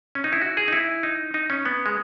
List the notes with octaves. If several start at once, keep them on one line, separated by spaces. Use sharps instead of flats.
C#4
D#4
E4
F#4
G#4
D#4
E4
D#4
D#4
C#4
B3
G#3